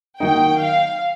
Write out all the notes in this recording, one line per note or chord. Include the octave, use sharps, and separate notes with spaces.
D#3 F#3 A#3 D#4 G5
F5